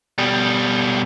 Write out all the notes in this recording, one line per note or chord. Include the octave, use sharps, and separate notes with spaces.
B2 G3